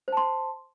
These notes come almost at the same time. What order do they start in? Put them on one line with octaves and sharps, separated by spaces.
C5 A5 C6